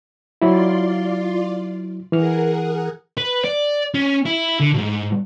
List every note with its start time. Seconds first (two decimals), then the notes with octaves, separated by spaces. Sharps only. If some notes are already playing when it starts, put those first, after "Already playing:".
0.42 F#3 E4 F4 D5 C6
2.12 E3 G#4 A#4 F#5 F6
3.17 B4
3.44 D5
3.94 C#4
4.25 E4
4.60 D3
4.74 B1 G#2